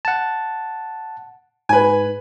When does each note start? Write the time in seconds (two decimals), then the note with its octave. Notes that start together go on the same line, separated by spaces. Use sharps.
0.05 F#5 A5
1.69 G#2 B4 G#5